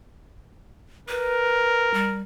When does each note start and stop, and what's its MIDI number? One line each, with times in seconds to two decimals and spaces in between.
1.09 2.22 70
1.09 1.91 71
1.94 2.21 55